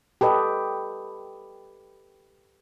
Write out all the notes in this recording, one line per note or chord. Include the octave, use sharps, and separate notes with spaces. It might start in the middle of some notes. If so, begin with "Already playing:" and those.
G4 A4 B4 D#5